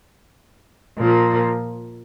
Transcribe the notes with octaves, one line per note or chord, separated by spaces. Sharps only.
A#2 F3 A#3